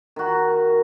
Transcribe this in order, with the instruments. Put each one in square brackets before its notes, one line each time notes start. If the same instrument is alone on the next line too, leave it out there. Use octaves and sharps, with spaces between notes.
[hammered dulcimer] D#3 F#4